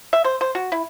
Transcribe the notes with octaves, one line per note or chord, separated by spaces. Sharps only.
E5
C5
C5
F#4
E4